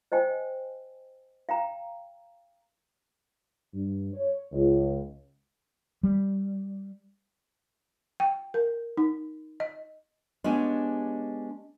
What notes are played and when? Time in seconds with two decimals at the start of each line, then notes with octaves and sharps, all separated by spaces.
0.12 C5 D#5 G5 G#5
1.49 F5 G5 A#5
3.74 G2
4.14 C#5
4.52 C#2
6.03 G3
8.20 G5
8.54 A#4
8.97 D#4
9.60 D#5
10.44 G#3 B3 C#4 D4 G4